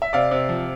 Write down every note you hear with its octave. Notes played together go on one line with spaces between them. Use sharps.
E5
C3 D5 F5
C3
F3